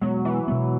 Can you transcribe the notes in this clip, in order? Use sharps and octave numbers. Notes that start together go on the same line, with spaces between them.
B2 F#3 G#3 B3
E3
B2 G#3 B3